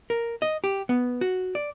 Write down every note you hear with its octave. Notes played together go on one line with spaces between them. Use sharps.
A#4
D#5
G4
B3
F#4
D5